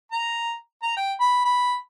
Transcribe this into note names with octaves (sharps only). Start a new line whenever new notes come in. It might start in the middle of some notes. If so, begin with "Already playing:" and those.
A#5
A#5
G5
B5
B5